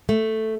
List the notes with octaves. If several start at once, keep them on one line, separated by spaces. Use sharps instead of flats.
A3